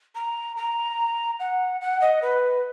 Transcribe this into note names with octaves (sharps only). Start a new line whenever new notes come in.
A#5
A#5
F#5
F#5
D#5
B4